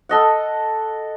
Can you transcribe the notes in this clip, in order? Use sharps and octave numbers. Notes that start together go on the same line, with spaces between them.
A4 D#5 F#5